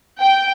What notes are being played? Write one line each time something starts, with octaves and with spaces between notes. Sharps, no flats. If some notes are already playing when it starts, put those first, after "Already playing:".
G5